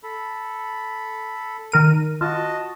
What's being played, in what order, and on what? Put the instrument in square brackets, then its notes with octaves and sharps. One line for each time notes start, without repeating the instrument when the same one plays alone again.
[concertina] A4 B5
[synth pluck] D#3 A#4 D#7
[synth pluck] F4 [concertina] F#4 D#5 A5